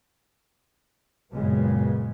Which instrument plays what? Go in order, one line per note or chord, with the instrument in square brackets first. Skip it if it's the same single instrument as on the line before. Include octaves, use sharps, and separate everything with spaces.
[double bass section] G#1 F#2 A#2 C#3 G#3 B3